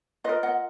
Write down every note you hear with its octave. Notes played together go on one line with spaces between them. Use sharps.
F4 A#4 B4 D#5
D#5 F#5